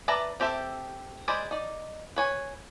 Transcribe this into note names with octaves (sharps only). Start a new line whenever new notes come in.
B4 D5 E5 A5 A#5
C4 G4 A4 E5
G#3 C5 D5 G#5 B5
D#4 D5
B4 C#5 G#5